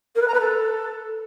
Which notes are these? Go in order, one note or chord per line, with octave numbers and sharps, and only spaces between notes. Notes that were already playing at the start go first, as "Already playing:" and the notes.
A#4
B4
A#5
B4
A4